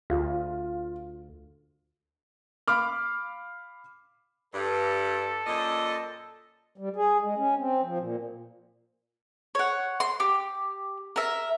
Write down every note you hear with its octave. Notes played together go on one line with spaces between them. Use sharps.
D2 F4
F5 B5 D6 F6
G2 A4
F#2 A#2 D#5
G3
G#4
G#3
C#4
C4
F3
A#2
C#5 F#5
C6
G4
A#4 E5